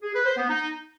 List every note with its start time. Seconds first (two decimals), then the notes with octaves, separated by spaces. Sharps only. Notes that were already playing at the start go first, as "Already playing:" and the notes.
0.02 G#4
0.14 B4
0.25 C5
0.37 B3
0.48 D#4